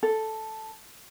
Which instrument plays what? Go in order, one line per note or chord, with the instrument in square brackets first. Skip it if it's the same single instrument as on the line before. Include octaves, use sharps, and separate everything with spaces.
[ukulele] A4